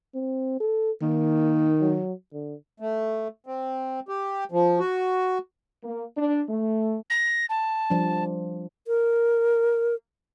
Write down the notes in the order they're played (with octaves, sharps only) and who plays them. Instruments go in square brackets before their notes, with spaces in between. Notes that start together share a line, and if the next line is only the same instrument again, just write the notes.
[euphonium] C4
A4
[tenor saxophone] D#3 [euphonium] A#3
[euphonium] F#3
D3
[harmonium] A3
C4
G4
F3
F#4
[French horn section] A#3
D4
A3
[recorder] A#6
A5
[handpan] F3 G3 D4
[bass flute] A#4